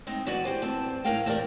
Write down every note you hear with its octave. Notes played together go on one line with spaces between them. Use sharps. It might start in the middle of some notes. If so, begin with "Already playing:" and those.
G#3 C4 D#4
E2 B3 F#4 B4 D5 G#5
G4 C5 G#5
G2 C4 A5
A2 C#4 G#4 A#4 F5 G5
E2 A#2 G4 A#4 D5